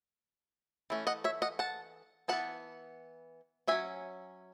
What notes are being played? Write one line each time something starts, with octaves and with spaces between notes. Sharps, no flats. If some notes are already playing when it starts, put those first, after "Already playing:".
E3 A3 C#4
D#5 F#5
C#5 E5
D#5 F#5
F#5 A5
E3 B3 D#4 F#5 A5
F#3 C#4 E5 G#5